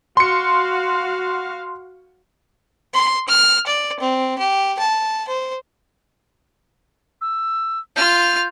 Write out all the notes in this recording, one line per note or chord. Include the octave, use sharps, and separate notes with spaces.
F#4 F5 C6 C#7
C6
F6
D5
C4
G4
A5
C5
E6
F4 F6 G6